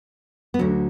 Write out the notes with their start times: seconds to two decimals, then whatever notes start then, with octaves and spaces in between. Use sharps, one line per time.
0.54 B3
0.59 D2 D3 F#3 C#4